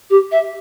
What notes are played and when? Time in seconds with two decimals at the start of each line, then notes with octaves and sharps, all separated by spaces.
0.10 G4
0.31 E5